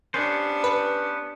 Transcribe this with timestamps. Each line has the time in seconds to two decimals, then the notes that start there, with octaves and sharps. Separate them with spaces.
0.14 B3 C#4 D4 G4 C5
0.64 B4